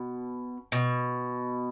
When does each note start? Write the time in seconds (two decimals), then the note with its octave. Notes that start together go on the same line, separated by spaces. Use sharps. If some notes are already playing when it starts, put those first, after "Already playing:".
Already playing: B2
0.72 B2